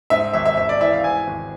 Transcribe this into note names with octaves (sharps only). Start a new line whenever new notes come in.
G#2 E5
G#1 E5
E5
G#1 E5
D5
E3 E5
F5
G#2 G#5
G#1